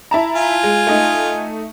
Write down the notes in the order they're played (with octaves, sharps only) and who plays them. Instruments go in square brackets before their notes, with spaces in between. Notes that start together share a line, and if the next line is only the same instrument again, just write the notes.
[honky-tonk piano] E4 A5 A#5
[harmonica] F4 G#5
[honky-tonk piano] G#3
A3 D#4